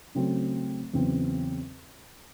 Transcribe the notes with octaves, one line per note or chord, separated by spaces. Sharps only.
C#3 F#3 A3 C4
E2 C#3 F#3 C4